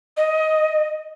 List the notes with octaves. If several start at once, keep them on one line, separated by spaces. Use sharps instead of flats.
D#5